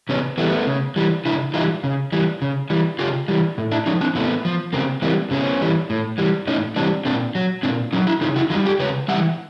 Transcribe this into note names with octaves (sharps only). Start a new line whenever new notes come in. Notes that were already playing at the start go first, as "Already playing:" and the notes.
C#3 B3 C#4
E3 G3 A3 B3
C#3
E3 G3
C#3 D4 E4
E3 G3 D#4 F4
C#3
E3 G3
C#3
E3 G3
C#3 F4 G4
E3 G3
A2
D4 E4
F3 C#4 D#4
C4 D4
A2 A3 B3
F3
C#3 A#3 C4
E3 G3 A#3 C4
C#3 B3 C#4
E3 G3
A2
E3 G3
A2 C#4 D#4
E3 G3 C4 D4
A#2 C4 D4
F#3
A#2 C4 D4
F#3 C#4 D#4
D4 E4
C#3 D#4 F4
E4 F#4
E3 D#4 F4
G3
F4 G4
C#3 B4 C#5
E3 G3 E5 F#5